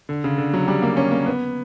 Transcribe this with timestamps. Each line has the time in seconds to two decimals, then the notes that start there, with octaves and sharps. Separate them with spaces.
0.09 D3
0.24 C#3
0.38 D3
0.53 F#3
0.68 G3
0.82 A#3
0.97 C#4
1.11 A#3
1.26 B3